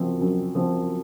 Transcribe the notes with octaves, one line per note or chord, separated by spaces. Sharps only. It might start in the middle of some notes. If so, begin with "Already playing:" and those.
Already playing: F#2 F3 C4
F#2
F3 C4